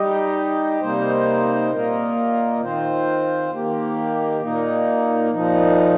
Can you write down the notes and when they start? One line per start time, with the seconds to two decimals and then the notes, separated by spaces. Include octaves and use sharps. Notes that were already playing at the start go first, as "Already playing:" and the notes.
Already playing: G3 D#4 G4 D#5
0.81 C3 G3 A#3 D#4 C5
1.71 A#2 A#3 F4 A#4 D#5
2.60 D#3 C4 F4 C5
3.51 D#3 A#3 G4
4.41 A#2 A#3 D#4
5.31 A#2 F3 D#4